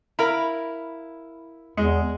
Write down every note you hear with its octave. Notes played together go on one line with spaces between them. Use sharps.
E4 A#4 F5 B5
E2 G#3